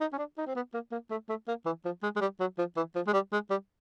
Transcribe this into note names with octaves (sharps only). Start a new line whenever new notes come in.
D#4
C#4
D4
D#4
C4
B3
A#3
A#3
A3
A3
A#3
E3
F3
G#3
G#3
G3
F#3
F3
E3
F3
G#3
G3
G#3
G3